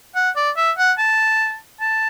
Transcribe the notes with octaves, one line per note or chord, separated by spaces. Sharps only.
F#5
D5
E5
F#5
A5
A5